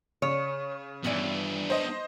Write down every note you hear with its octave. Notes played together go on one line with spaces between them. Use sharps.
C#3 C#5
G2 E3 B3 D4 D5
C5 D#5